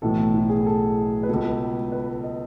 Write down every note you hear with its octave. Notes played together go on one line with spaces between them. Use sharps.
B1 A2 E3 A4
E4
G#4
A4
B4
C#2 B2 A4
B4
D#5